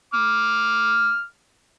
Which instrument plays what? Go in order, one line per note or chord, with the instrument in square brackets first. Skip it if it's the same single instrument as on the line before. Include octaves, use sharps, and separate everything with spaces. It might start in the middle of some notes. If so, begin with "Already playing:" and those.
[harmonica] D6 F6